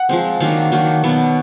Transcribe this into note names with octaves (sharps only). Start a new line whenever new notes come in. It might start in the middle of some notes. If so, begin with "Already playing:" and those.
Already playing: F#5
F3 G#3 C4
D#3 F#3 A#3 D4 F5
D#3 F#3 A#3 D4
B2 F#3 B3